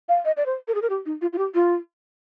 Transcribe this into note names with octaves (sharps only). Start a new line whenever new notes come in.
F5
D#5
D5
C5
A#4
G#4
A#4
G4
D#4
F4
F4
G4
F4